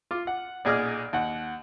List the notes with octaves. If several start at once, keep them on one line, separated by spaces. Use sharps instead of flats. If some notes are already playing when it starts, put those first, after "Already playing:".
F4 D6
F#5
B1 A#2 G#4 D#5 D6 F6
D#2 F#5